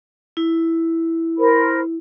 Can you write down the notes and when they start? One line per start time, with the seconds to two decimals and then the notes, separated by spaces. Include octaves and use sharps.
0.37 E4
1.39 A#4 C5 B5